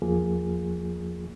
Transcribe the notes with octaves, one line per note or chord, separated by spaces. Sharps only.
E2 F3 A#3 F4 G#4